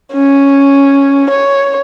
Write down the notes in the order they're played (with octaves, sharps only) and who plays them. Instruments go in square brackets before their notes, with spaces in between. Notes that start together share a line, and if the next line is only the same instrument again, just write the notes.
[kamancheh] C#4
C#5